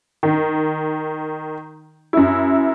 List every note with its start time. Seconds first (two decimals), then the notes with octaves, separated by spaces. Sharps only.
0.23 D#3
2.13 F#2 E4